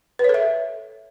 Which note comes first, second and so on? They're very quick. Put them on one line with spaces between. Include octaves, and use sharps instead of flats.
B4 C#5 A4 E5